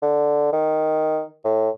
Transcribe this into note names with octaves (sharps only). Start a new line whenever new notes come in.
D3
D#3
A2